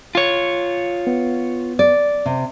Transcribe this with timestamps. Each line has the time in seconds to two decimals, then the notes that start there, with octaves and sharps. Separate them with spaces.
0.15 F4 C#5
1.07 B3
1.79 D5
2.26 C3